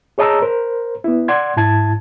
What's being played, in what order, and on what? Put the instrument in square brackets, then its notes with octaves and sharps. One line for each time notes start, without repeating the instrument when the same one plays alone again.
[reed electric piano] G#4 C#5 D#5 A5 A#5 E6
A#4 C5
B3 E4
D5 F#5 C6 G#6
G#2 E4 A5 G#6